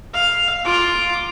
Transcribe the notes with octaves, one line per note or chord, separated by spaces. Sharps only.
F5
F4 D6